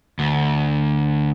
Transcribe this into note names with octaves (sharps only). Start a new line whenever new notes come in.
D2